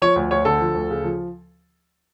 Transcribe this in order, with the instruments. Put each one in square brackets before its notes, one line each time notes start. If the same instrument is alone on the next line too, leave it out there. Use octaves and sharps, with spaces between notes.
[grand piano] F3 C#5
D2
D2 C#5
D3 A4
F3
D2
C#3
F3